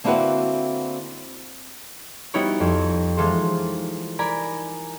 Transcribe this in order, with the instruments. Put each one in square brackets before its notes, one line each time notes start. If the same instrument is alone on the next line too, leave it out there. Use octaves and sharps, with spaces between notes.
[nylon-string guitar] D3 A#3 C4 E4 F#4 B4
[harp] G3 B3 D#4 E4 F#4 C#5
F2
E3 G#3 D#4 F4 A4 C5
A#4 D5 G#5 A#5 B5